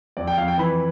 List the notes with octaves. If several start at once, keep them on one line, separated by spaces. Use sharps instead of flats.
F2 D5
G5
F2 F5
G5
E3 B5